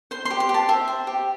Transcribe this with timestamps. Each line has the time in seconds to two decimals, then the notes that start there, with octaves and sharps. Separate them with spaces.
0.11 C5 C6
0.25 C6
0.30 G4
0.40 C6
0.49 G4
0.54 A5
0.69 C5 E5
0.88 C5
1.07 G4